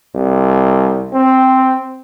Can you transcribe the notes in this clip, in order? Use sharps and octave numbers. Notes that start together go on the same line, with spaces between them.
C2
C4